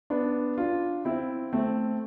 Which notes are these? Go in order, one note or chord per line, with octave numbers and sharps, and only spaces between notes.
B3 D4
D4 F4
C4 E4
A3 C4